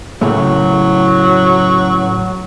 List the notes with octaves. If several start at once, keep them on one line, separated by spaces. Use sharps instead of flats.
A2 C#3 F#3 A3